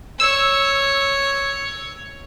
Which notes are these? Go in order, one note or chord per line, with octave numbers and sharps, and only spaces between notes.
C#5 E6